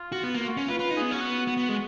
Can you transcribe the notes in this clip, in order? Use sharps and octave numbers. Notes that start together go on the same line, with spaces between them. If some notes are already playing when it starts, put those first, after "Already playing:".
Already playing: F4
F#4
B3
A#3
F#4
C#4
F4 B4
F4 B4
D#4
B3 G#4
C#4 F#4
B3
B3
B3
G#3